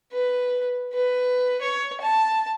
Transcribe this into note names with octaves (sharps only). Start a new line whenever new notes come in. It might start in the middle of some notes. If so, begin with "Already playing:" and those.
B4
B4
C#5
A5